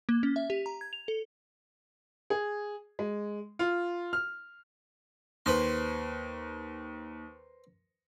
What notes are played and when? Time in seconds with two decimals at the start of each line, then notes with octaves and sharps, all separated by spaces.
0.09 A#3
0.23 C#4
0.36 E5
0.50 G4
0.66 A#5
0.81 G#6
0.93 F7
1.08 A4
2.30 G#4
2.99 G#3
3.59 F4
4.13 F6
5.46 D#2 B4 C5 C6